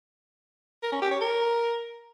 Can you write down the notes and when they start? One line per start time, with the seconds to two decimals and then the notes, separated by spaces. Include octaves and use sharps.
0.83 A#4
0.92 C#4
1.02 G4
1.11 C#5
1.20 A#4